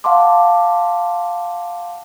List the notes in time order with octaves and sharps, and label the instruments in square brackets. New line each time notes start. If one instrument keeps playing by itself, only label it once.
[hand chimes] F5 F#5 A5 C6 D6